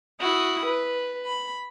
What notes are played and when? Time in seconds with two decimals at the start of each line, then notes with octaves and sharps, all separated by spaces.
0.19 E4 F#4 D#6
0.66 B4
1.24 B5